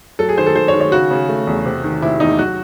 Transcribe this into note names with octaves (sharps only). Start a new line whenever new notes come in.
F#3 A4
G#4
D#3 C5
A4
D#3 C5
C#5
D#3
C#5
C#3 F#4
C#3
A3
E2
C3
D#3
C3 E4
E2 D#4
F#3 F#4